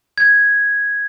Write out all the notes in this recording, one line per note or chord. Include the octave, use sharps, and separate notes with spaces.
G#6